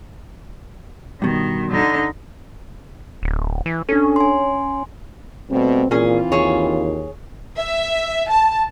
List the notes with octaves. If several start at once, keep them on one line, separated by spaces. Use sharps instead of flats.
G2 B2 D#3
D3 D#4
D1
E3
C#4 D4 A4
G#5 C6
B2 G3 A3 C4
A#2 E3 C4 C#4 F4 G#4
D#2 G#4 C#5
E5
A5